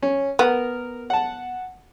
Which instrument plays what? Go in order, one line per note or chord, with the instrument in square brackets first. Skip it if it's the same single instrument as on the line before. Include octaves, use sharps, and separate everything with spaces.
[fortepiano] C#4
[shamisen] B3 [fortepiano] A#4
[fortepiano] F#5 A5